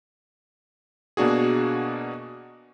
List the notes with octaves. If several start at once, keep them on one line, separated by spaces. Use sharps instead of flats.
B2 A#3 D4 F#4 G#4